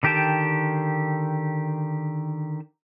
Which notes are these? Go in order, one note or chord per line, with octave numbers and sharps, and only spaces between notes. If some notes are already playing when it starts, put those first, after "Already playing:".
D3 D#3 G4 G5 A5